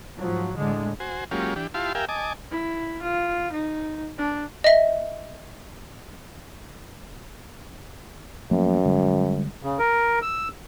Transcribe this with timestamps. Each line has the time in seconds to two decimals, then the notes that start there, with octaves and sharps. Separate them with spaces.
0.19 G#2 F3 F#3
0.57 A2 D3 G#3
1.00 F#4 C5 G#5
1.31 F#3 G#3 A#3 C#4 F4 G4
1.56 E3 D4 G4
1.74 E4 F4 G4 F5 A5 C6
1.95 G4 A#4 E5 F5 G5 G#5
2.09 D#5 G#5 A5 D6
2.50 E4
3.03 F4
3.52 D#4
4.18 D4
4.64 D#5 E5
8.51 F#2 F3 A3 A#3
8.85 D3 G3 G#3
9.63 C#3
9.79 A#4
10.22 E6